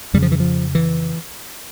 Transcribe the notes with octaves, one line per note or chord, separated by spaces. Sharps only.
F2 C#3 G3
F3
E3
F3
E3